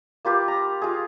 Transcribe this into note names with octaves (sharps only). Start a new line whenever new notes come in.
A#3 F4 G4 B4
A#5
F4 G#4